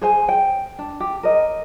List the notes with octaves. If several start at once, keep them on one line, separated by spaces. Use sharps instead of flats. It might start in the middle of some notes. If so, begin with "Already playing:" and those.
G#4 C5 G#5
G5
D4
G4
A#4 D#5